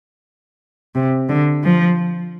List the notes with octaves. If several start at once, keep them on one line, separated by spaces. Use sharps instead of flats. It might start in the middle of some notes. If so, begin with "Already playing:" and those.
C3
D3
F3